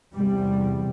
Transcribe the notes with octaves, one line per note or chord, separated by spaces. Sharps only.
E2 C3 G3